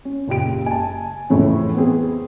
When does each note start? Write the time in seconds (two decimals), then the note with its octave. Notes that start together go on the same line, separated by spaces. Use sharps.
0.05 C#4
0.28 F#1 A#2 G4 D7
0.66 G#5 A5
1.30 F2 A2 C#3 E3 C4 C#4
1.75 B3 C4 G#4